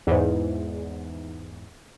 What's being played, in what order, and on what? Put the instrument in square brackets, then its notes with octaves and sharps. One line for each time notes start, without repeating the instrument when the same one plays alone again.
[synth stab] E2 G#2